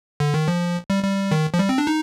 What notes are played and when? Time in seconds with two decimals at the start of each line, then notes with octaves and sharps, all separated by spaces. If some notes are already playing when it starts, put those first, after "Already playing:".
0.20 D3
0.34 D#3
0.48 F3
0.90 G3
1.04 G3
1.31 D#3
1.54 F3
1.59 G3
1.69 C4
1.78 D4
1.87 D#4